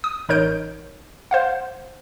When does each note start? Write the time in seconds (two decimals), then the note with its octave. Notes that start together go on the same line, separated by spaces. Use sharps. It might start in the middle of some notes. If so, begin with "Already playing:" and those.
0.04 D#6
0.29 A1 D#4 A#4 C#5 G6 D7
1.31 C5 F5 F#5